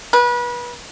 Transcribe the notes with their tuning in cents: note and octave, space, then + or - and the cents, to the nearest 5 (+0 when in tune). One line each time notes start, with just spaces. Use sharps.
B4 -30